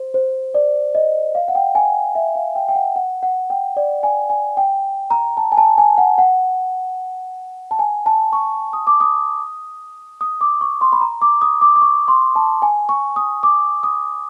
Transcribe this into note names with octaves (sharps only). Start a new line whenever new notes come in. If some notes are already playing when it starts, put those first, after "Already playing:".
Already playing: C5
C5
D5
D#5
F5
F#5
G5
G#5
E5
F5
G5
G5
F#5
F#5
F#5
G5
D5
G#5
G#5
G5
A#5
A5
G#5
A5
G#5
F#5
F#5
A5
G#5
A5
C#6
D#6
D6
D#6
D#6
D6
C#6
C6
B5
A#5
D6
D#6
D6
D6
C#6
C6
A5
G#5
C#6
D#6
D6
D#6